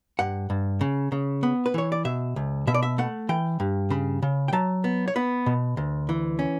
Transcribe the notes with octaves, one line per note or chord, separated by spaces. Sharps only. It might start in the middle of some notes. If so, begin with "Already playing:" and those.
G2 F#5
G2
C#3
C#3
B3
B4
E3 C#5
D5
B2 E5
C#2
B2 E5
D5
E5
A3 F#5
E3 G5
G2
C#3 B5
C#3
G5
F#3 A5
B3
C#5
B3 B4
B2
D2
E3
C#4